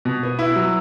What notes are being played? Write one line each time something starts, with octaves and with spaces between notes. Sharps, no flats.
B2
B3
E4
F#3